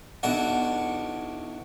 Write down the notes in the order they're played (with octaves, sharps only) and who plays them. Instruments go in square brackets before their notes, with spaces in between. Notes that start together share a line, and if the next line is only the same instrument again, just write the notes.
[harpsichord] B1 E2 D4 F#4 F#5